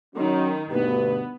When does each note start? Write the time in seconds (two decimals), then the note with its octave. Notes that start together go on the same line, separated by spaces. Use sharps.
0.16 D#3 F#3 C#4
0.71 D2 G2 B2 B3